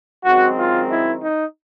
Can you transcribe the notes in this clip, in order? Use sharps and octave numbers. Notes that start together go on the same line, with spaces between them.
F#2 D#3 G#3 C4 F#4
F4
E4
D#4